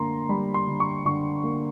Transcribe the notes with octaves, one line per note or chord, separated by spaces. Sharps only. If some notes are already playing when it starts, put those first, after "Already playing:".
Already playing: D3 A#3 A#5 C6
G3 B5
C6
D3
C#6
D3 C#6
A#3